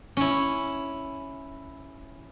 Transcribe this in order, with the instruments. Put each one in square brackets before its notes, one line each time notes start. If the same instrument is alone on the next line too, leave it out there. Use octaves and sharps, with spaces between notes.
[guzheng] C#4 E4